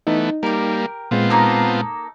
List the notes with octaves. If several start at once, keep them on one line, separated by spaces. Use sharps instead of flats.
E3 A3 B3 D#4
G3 A#3 G4 A#4
A#2 G#3 B3 C4 F4
A#3 D#4 A4